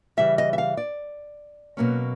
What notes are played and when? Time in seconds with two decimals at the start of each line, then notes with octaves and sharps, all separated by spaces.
0.17 C#3 E3 G3 E5
0.38 D#5
0.53 E5
0.58 F5
0.77 D5
1.77 B2 F#3 A#3 C#4